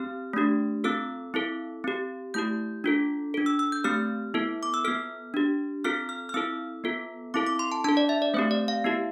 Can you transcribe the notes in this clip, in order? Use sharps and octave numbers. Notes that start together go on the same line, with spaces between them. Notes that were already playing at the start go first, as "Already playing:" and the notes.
Already playing: C4 G4 F6
A3 D4 G4
C4 F4 A4 E6
C4 E4 A4
C4 G4
A3 E4 G4 G6
D4 F4 A4
D4 A4
E6
E6
G6
A3 C4 G4 F6
B3 E4 A4
D6
E6
B3 F4 A4 F6
D4 G4
C4 F4 A4 F6
F6
F6
C4 E4 A4 E6
B3 F4 A4
C4 E4 A4 D6
D6
C6
A5
D4 A4 A5
D5
E5
D5
A3 C4 G4 C5
D5
F5
B3 E4 G4